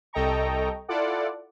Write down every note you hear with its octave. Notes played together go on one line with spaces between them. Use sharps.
C2 A4 D#5 G5 A#5 C#6
E4 F4 A4 D5 F#5